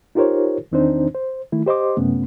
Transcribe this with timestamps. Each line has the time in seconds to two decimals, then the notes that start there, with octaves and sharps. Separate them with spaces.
0.15 D#4 F4 G4 A#4 C5 C#5
0.72 E2 D#3 C4 D4 D#4 C5
1.14 C5
1.52 D#3 A3 E4
1.66 G4 C5 D#5 C6 D6
1.97 F#2 C3 A3 B3 C#4